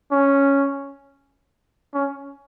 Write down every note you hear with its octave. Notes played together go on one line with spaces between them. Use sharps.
C#4
C#4